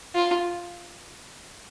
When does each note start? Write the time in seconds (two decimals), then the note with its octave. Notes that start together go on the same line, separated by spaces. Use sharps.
0.15 F4